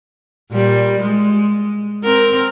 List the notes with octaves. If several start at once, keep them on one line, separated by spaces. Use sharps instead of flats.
A#2 G3
G#3
C4 A#4